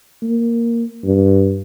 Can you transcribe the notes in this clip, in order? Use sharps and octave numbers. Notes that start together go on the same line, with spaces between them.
A#3
G2